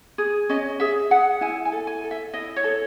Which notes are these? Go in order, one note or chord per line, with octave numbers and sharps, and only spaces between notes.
G#4
C#4 D#5
G#4 E5
G#4 F#5
E4 G#5
G#5
A4
G#5
A4
E5
E4 D#5
C#5
A4